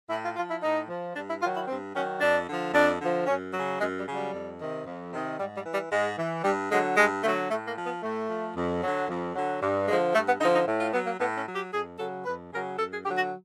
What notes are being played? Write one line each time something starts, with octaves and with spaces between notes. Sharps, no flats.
A2 E4
F4
F3 F4
E4
A2 D#4
F3
G2 D4
E4
D#3 F#3 F4
E4
G2 C4
D#3 F#3 C#4
F2 D4
D3 F3
F2 D4
D3 F3
F#2 C#4
C#3 F#3
F#2 G#3
G3
C#3 F#3
G3
F2
C3 D#3
F2
C3 D#3
G#2 G3
G3
E3
G3
G#2 G#3
E3
G2 G3
D3 F#3 G#3
G2 G#3
D3 F#3 A3
A2 A3
A#3
F3
B3
A2 A3
F3
F2
D3 F#3
F2
D3 F#3
G2
D3 F3 G#3
G2 A3
B3
D3 F3 D#4
D#4
A2
F4
F#3 B3
A#3
A2 B3
C#4
F#3
G4
F2 G#4
C#3 F#3 A4
F2 B4
C#3 F#3 A#4
F#2 A4
G#4
D3 F#3 G4
F#4